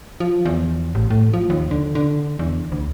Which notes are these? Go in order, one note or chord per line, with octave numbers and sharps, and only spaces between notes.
F3
E2
A1
A2
F3
D#2
D3
D3
E2
D2